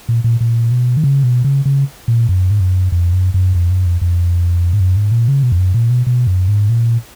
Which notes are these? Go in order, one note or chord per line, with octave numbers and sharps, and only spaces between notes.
A#2
A#2
A#2
B2
D#3
C#3
B2
C#3
C#3
A#2
F#2
G#2
F#2
F2
F#2
F#2
F2
F#2
F2
F2
G#2
F#2
G#2
A#2
C#3
B2
F2
F#2
A#2
B2
B2
F#2
G#2
A#2